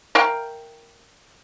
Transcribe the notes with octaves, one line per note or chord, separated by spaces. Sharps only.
A#4 F5 G5